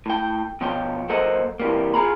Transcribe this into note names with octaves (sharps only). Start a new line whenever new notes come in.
A2 G5
B2 F3 C#5 G5
F#3 A#3 A4 C5 D#5 F#5
C3 E3 G3 A#3
F4 G#4 A#5 B5